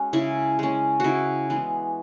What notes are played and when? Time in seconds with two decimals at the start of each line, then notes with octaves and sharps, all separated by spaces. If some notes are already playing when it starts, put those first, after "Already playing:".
Already playing: G#3 C#4 F#4
0.13 C#3 E4
0.59 G#3 C#4
1.00 C#3 E4 F#4
1.50 E3 G#3 B3